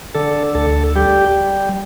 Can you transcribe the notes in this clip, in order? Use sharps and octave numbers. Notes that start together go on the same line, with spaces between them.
D3 A4
D2 A4
G3 G4